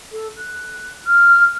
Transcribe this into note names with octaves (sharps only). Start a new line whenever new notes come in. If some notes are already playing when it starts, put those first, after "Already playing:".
A4
F#6
F6